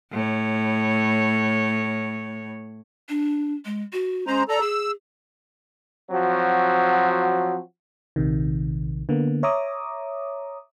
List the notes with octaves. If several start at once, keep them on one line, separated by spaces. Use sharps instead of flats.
A2 C#5
D4
G#3
F#4
G#3 C#4 C5 A#5
A4 D5 A#5
G#4 E6
F3 F#3 C4 F#4
A#1 C3 D#3
D3 A#3 B3
C#5 E5 A#5 D6 D#6